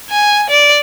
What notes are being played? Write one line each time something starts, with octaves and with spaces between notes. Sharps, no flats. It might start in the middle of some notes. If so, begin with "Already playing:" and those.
G#5
D5